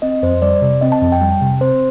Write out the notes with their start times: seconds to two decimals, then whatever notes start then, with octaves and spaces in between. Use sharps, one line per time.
0.02 C4 D#5
0.23 F2 C5
0.42 G3 D5
0.62 C3
0.81 C4 D#5
0.92 A5
1.02 F2
1.12 G5
1.21 G3
1.41 C3
1.61 C4 C5